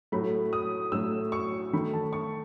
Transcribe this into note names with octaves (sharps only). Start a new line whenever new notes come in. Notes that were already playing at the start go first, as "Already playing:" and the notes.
A2 F#3 A3 B5
D#6
A2 F#3 A3 E6
C#6
D#3 A3 B5
A5
C#6